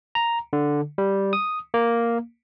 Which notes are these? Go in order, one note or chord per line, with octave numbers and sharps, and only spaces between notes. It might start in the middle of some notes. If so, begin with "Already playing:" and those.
A#5
D3
G3
D#6
A#3